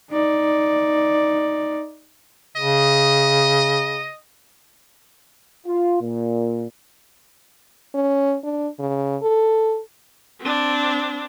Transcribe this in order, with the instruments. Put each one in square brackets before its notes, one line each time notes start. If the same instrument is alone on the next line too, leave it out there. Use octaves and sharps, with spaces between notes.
[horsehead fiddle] D#4 D5
[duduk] C#3 [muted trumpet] D#5
[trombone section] F4
A#2
[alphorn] C#4
D4
C#3
A4
[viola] C4 D4